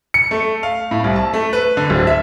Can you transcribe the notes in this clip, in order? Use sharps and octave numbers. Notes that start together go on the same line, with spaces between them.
C#7
A3
F5
A2
C2
A5
A3
B4
D3
D1
E5